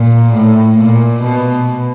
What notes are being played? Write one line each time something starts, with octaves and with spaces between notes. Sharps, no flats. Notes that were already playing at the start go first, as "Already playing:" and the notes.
Already playing: A#2
A2
A#2
B2